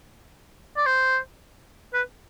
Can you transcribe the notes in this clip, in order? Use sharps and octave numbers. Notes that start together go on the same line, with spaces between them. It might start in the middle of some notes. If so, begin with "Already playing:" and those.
D5
C5
B4